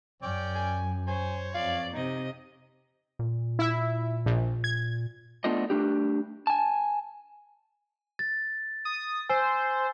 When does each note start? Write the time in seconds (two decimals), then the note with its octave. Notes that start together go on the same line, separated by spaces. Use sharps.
0.22 F#2 C#4 D5 G5
0.55 G#5
1.08 C5 C#5 G#5
1.54 F2 D5 F5
1.93 C3 D#4 D#5
3.19 A#2
3.59 E4 E5
4.26 A#1
4.64 G#6
5.44 A3 B3 D4 F4 D#5
5.70 A3 D4 G4
6.47 G#5 A5
8.19 A6
8.85 D#6
9.30 C5 G#5 E6